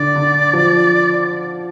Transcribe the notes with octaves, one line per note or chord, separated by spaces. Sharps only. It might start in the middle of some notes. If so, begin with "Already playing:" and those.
Already playing: D3 D5
D3
F3